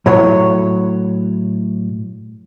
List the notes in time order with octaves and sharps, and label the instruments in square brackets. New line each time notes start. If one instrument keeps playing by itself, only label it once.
[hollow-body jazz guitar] A2 F#3 C#5